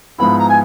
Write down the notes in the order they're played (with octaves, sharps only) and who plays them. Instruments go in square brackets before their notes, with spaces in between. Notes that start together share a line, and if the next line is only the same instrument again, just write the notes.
[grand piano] G#2 F3 G#3 B3 E4 [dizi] B5
[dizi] A#5
G#5